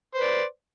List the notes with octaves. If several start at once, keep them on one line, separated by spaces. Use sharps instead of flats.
B4 C5 D5